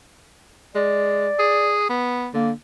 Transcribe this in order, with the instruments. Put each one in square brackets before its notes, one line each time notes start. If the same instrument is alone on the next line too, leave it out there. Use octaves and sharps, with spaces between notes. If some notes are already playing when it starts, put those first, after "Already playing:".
[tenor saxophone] G#3 [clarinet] D5
[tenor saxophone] G#4
B3
[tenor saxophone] D3 [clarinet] A#3